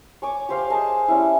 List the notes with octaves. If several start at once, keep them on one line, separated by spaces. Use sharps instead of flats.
C#5 G#5 C#6 D6
G4 C5 F5 D6
G#4 D#5 G#5 A5
G3 C#4 E4